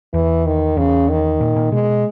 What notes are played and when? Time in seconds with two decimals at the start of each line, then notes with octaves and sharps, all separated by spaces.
0.14 E2 E3
0.46 D#3
0.77 E2 C#3
1.09 D#3
1.41 A#2
1.56 A#2
1.72 B2 G#3